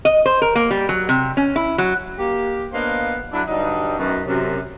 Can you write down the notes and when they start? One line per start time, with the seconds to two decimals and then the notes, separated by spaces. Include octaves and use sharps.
0.05 D#5
0.26 C5
0.42 A#4
0.55 A#3
0.71 G3
0.89 F#3
1.09 C3
1.37 C#4
1.56 E4
1.78 F#3
2.19 A#3 G4
2.73 A#3 B3 D4 C5 D#5 F5
3.33 D3 F#3 D4 E4
3.48 G2 D3 F#3 G3 D#4
3.98 F#2 B2 D#3
4.26 F#2 C3